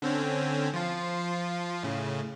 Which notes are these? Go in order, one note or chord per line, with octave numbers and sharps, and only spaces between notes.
D3 C4 C#4
F3 F4
A2 C#3